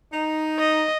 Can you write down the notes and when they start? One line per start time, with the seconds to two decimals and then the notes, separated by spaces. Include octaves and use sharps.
0.13 D#4
0.60 D#5